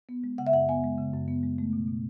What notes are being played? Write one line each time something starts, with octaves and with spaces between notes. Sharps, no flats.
B3
G#3
C#3 F#5
E5
F#2 F#5
B3 G#5
G#3
C#3
F#2
B3
G#3
A3
B2
B2